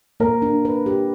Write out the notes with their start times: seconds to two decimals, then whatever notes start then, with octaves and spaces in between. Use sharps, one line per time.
0.20 A#3 A#4
0.42 D4
0.65 B4
0.86 G4